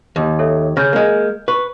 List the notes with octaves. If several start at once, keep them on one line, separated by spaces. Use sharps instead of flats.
D#2
A4 C#5 E5
C#3 F6 G6
G#3 A#3
B4 C#6